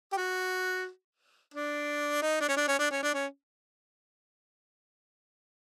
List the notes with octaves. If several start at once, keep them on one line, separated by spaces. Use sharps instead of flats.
G4
F#4
D4
D#4
D4
C#4
D4
C#4
D4
C#4
D4
C#4